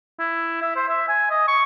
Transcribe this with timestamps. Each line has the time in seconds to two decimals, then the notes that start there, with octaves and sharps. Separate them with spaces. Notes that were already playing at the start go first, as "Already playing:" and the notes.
0.19 E4
0.62 E5
0.76 C5
0.88 E5
1.08 G#5
1.30 D#5
1.48 C#6